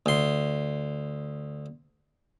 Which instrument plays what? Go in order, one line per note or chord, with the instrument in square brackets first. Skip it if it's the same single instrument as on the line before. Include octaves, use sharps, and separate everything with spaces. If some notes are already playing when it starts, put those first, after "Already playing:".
[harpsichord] D2 C6